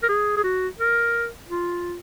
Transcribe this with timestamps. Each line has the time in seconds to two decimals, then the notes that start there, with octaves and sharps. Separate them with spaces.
0.03 A#4
0.09 G#4
0.37 G#4
0.44 F#4
0.79 A#4
1.49 F4